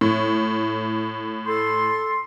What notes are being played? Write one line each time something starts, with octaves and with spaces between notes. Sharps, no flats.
A2
A4 C6